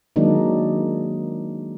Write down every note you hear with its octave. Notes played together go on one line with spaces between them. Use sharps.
D#3 F#3 G#3 A#3 D4 D#4